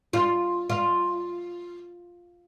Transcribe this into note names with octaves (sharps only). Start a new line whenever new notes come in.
F4
F4